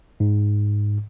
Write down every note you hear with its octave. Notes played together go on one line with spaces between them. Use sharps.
G#2